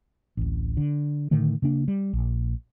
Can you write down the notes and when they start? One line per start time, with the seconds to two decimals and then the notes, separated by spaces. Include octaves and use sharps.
0.37 D1 A1
0.77 D3
1.31 A2 D3 D#3 A3
1.62 C#3 A#3 D4
1.88 G3
2.13 A#1